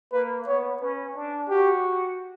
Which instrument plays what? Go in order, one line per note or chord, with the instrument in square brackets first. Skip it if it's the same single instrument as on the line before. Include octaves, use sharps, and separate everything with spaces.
[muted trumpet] A#3 [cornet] B4
[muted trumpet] B3 [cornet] C#5
[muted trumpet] C#4 [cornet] B4
[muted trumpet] D4
[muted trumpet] F#4 [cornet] G4